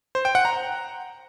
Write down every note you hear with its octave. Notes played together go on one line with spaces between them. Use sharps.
C5
G5
F#5
A#5